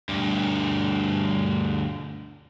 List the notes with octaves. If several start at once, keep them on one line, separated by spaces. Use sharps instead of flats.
D2 G2